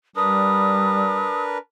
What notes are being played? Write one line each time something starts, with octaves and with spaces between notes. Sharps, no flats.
G3 D4 A#4 B4 D#6